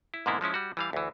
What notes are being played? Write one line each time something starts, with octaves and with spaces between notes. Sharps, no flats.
E4
G#2 B2 D3 A#3 B3 E4
F3 G#3 C#4 E4
G3 F#4
E3 G3 F5
D2 E3